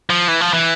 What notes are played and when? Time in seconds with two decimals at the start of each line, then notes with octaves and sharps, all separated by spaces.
0.10 F3
0.28 E3
0.41 F3
0.53 E3